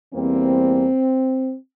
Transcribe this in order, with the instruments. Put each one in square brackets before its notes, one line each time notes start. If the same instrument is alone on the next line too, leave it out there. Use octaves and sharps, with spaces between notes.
[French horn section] E2 E3 G3 A#3 C4